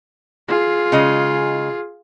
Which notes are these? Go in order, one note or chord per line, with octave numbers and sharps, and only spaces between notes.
F4 G#4
C#3 G#3 D#5